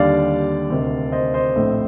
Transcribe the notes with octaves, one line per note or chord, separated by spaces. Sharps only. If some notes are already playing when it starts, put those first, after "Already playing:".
Already playing: D#2 D3 G3 D5 F5
D2 C3 D#3
C5 D#5
C5 D#5
A#1 A2 A3 C4